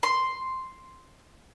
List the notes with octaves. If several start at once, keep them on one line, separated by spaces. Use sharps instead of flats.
C6